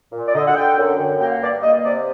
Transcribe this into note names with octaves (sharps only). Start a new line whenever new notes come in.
A#2
D5
D3 D#5
F#5
D3 G5
F#2
F#2
A#3 G5
F#5
G2 D5
D5
A#3 D#5
C3 D5